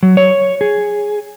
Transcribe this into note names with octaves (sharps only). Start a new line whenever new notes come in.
F#3
C#5
G#4